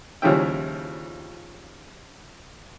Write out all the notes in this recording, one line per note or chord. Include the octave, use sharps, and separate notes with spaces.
D#2 C#3 F3 G3 E4 G5